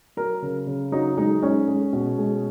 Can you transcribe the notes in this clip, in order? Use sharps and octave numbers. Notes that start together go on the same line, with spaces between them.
F#3 A#4
C#3
C#3
F#3 D#4
G#3 D#4
G#3 C#4
G#3
B2
G#3